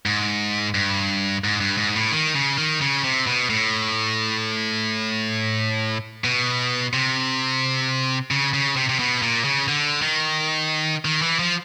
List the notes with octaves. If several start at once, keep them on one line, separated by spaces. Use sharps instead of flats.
G#2
G2
G#2
G2
G#2
A2
D#3
C#3
D#3
C#3
C3
B2
A2
B2
C3
C#3
C#3
C3
C3
B2
A#2
C#3
D3
D#3
D#3
E3
F3